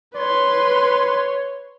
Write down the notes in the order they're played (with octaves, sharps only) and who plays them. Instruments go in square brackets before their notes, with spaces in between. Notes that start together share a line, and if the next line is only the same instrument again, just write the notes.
[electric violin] B4 C6 [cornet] C#5